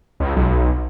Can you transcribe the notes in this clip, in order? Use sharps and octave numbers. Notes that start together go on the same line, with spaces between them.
C#2
B1